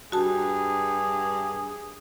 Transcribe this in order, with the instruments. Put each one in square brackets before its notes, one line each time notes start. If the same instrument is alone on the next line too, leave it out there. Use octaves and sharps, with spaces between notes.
[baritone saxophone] G2 [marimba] F#4 A5 [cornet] G#4